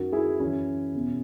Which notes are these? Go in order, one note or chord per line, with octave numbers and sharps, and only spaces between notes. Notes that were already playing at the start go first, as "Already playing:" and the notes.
Already playing: F#2 D#3 F#4 A#4
E4 G#4
F#2 E3 C#4 E4
E2 B2